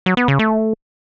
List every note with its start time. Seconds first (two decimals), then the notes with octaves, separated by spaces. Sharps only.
0.06 F#3
0.17 B3
0.28 C#3
0.39 A3